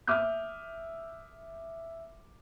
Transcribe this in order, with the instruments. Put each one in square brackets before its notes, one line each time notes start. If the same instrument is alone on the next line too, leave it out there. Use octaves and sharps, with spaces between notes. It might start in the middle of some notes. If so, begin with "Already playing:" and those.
[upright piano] E5 D6 D#6 F6 G6